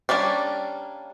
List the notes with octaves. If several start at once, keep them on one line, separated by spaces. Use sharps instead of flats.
G3 A#3 C#4 D4